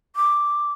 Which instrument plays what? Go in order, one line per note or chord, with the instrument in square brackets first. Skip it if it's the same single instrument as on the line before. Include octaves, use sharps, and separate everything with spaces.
[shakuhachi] D6